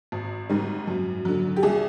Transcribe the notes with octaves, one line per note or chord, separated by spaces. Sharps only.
G#1
G#2 D#3 G3
F#2
D3 F#3
G4
C2 G#4